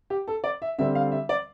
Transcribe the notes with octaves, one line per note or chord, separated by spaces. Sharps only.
G4
A4
D5
E5
D3 G3 C4 E5
F5
E5
D5